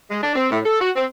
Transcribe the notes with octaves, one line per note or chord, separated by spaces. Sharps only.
G#3
D4
C4
A2
A4
F#4
C4